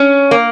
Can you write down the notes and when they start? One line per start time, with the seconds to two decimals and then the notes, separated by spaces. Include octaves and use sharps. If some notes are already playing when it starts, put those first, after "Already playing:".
Already playing: C#4
0.31 A#3